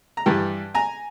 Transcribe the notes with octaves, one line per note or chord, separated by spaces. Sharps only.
A#5
G2 E3 G3 G5 A5
G#5 A#5